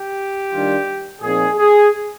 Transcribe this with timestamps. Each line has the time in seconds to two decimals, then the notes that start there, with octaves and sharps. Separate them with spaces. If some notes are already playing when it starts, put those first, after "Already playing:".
Already playing: G4
0.52 D#3 G3 D4 F4
1.21 A#2 F3 C4 D#4 G#4
1.57 G#4